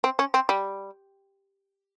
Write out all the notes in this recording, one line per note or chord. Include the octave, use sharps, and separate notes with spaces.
C4
C#4
C4
G3